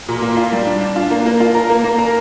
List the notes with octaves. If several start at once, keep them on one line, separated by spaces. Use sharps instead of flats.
A#2
A#3
F4
G3
D4
D4
F4
A#3
A#3
F4
A#4
A#3
A#3
A#4